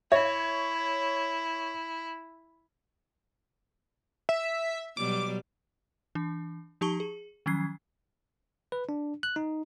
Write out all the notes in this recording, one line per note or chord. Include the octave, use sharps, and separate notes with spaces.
E4 C#5 E5
E5
B2 F#3 G3 D6
E3 D4
F3 D#4 G4 A5 C#6 G7
G#4
D#3 F3 F#3 C#4 G#6 C7
B4
D4
F#6
D#4